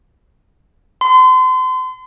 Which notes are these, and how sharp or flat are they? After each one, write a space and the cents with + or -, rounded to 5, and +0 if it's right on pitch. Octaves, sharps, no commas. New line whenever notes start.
C6 -35